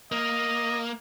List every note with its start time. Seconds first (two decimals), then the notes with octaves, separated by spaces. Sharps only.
0.12 A#3 D#5